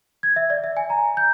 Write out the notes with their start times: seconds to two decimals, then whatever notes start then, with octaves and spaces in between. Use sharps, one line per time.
0.23 G#6
0.36 E5
0.50 D5
0.64 E5
0.77 G#5
0.90 A#5
1.17 G6